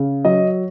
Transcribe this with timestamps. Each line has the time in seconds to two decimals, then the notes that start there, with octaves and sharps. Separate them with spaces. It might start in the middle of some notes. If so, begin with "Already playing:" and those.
Already playing: C#3
0.25 F#3 D#5